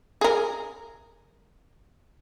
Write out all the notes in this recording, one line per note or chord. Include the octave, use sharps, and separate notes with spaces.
G#4 A#4